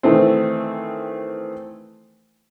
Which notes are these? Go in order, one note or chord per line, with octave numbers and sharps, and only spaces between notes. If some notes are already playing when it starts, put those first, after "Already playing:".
D#3 E3 A3 C4